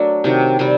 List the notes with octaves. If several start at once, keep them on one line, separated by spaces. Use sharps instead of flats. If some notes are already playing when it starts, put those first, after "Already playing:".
Already playing: F#3 A3 D4 A#4
C3 D#3 F#3
C3 G3 C4